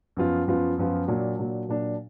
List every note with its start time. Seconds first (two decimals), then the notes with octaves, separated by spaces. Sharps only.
0.17 F#2 F3 B3 F4
0.48 F#2 F3 B3 F4
0.78 F#2 F3 B3 F4
1.08 A#2 F#3 D4
1.38 A#2 F#3 D4
1.69 A#2 F#3 D4